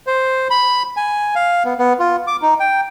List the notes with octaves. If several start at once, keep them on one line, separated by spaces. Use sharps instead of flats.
C5
B5
G#5
F5
B3
B3
F4
D6
D#4
G5